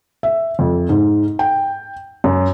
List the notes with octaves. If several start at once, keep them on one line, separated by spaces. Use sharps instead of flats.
E5
F2
G#2
G5
F#2